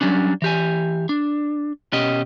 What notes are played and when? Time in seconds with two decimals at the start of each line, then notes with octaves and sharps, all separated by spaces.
0.01 F#3 G3 C#4 D4
0.42 E3 G4 G#5
1.09 D4
1.93 B2 C#4 G4 D#5